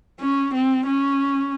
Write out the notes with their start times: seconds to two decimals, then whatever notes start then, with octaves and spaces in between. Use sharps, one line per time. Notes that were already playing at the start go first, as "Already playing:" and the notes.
0.21 C#4
0.54 C4
0.86 C#4